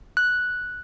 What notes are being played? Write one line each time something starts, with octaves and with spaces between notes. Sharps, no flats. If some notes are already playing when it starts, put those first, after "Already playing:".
F#6